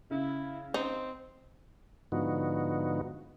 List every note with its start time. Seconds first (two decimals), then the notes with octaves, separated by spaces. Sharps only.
0.11 C#3 E4
0.74 C4 D#4
2.12 G#2 D3 F3 B3 D#4 F#4